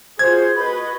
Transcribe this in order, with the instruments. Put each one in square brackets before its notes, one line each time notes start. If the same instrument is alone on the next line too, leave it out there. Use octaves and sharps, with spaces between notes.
[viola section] F4 F#4 G#4 [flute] C5 [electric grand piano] G#6
[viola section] F#4 B4 D#5 [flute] B5